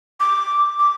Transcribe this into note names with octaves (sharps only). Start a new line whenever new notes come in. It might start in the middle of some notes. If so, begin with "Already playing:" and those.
D6
D6